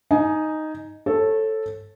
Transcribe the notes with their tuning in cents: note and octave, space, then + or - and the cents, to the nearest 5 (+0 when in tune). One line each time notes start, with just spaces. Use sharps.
D#4 +0 G#5 +15
A4 +0 C#5 -30